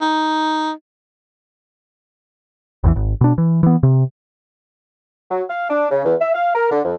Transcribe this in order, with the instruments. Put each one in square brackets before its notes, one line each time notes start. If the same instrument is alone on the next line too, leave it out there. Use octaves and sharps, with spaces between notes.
[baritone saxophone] D#4
[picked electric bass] A1 E2 C3 E3
G#1
B2 D4
E3
E3 B3
C3
[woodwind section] F#3
F5
D4
C#3
E2
E5
F5
A#4
D3
F2